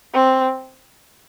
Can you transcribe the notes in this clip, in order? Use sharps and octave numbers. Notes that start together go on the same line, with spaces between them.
C4